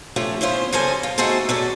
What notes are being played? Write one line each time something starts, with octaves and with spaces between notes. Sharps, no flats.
F3 A3 C#4 F4 G4
B3 C#4 E4 F4 C5
C#3 G3 A4 C5 D#5 G#5
F4
A3 D#4 F#4 G#4 A4 C5
F#3 C#4 A4 D5